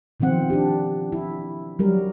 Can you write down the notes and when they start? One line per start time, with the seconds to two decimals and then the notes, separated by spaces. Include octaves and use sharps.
0.20 B2 D#3 F3 C4 F#5
0.50 D4 G4
1.12 E4
1.79 F#3 G3 A#4